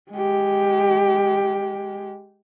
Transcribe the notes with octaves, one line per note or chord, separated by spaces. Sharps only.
G#3 G4